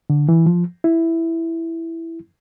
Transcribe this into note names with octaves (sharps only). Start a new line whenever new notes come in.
D3
E3
F3
E4